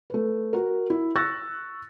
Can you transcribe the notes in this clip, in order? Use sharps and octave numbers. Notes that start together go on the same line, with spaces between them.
A3 B4
F#4 A#4
E4
C#6 E6 F#6 A6 A#6